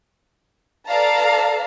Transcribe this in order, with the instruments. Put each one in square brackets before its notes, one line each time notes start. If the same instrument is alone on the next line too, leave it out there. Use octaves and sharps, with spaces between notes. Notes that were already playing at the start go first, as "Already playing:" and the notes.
[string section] A4 B4 D5 F5 A5 A#5